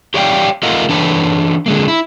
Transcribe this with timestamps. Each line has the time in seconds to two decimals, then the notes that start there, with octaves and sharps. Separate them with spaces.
0.14 G4 C#5 D5 F5 G5
0.63 A3 F4 A#4 D#5 F5 F#5
0.89 E3 D4 A4 B4 C#5
1.66 D3 G#3 A#3
1.88 E4